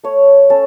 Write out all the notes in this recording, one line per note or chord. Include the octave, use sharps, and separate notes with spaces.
A3 C#5
C#4 A4